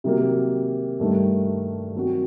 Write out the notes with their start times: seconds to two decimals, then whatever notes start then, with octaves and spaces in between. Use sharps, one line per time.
0.04 C3 D#3 F#3 A#3
1.00 G2 D#3 A3
1.95 D#3 F#3 C4 F#4